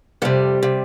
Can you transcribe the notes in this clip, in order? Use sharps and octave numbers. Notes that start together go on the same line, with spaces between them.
F2 C3 G3
C3